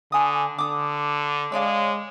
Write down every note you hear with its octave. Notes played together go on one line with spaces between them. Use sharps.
D3 G#5 D#6
D3 D6 D#6
G#3 C#5 D5 F5